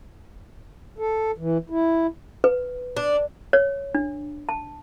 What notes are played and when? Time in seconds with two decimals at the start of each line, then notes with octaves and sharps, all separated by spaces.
0.98 A4
1.38 E3
1.70 E4
2.44 B4
2.97 D4
3.53 C#5
3.94 D4
4.49 A5